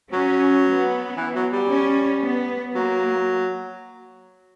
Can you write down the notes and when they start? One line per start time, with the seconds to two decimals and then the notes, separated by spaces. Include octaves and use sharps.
0.13 F#3 C#4
0.65 B3
1.17 E3
1.35 F#3
1.52 G3
1.70 C#4
2.23 B3
2.74 F#3 A#3